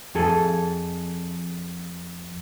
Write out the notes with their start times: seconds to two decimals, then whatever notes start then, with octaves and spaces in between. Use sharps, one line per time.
0.15 F2 G#4 A4